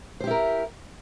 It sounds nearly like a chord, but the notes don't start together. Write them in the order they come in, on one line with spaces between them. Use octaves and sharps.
C5 G4 E4 A#4